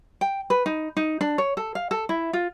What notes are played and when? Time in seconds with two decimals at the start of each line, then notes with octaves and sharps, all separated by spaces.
0.21 G5
0.50 B4
0.66 D#4
0.97 D#4
1.21 D4
1.38 C#5
1.57 A4
1.75 F5
1.91 A4
2.09 E4
2.33 F4